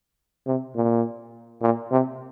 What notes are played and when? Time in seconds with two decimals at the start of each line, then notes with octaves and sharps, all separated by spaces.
0.47 C3
0.76 A#2
1.62 A#2
1.91 C3